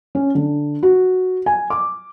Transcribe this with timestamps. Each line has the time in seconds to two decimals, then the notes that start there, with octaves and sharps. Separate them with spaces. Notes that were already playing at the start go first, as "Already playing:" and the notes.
0.15 C#4
0.35 D3
0.83 F#4
1.46 G#5
1.70 D6